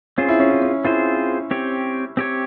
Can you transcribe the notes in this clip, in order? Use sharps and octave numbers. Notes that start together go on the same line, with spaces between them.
C4 C#4 F4 G#4 C5
E4
C#4
E4
C#4
C4 E4 F4 G#4 C5
C4 G4 C#5
C4 G4 C#5